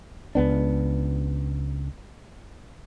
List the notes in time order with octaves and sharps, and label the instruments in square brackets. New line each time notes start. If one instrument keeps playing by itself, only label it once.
[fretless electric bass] C#2 B3 D4